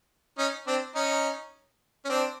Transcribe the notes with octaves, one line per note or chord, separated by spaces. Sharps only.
C#4 D#4
C4 D4
C#4 D#4
C#4
C4 D4